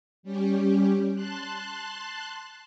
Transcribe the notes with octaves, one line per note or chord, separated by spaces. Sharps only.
G3 C#4 G4
A5 C6 F#6